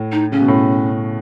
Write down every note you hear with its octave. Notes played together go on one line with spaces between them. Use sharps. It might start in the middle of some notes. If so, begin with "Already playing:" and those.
Already playing: A2
D#4
C#3 C#4
B2
A2